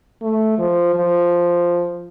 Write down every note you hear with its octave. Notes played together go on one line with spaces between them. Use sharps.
A3
F3
F3